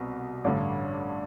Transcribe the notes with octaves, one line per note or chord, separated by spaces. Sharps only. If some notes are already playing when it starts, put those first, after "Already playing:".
Already playing: C2 B2 B4
A1 G2 D3 D5